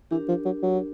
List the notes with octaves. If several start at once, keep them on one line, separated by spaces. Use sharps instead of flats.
E3 D4 G4 A#4
F3
F#3
F#3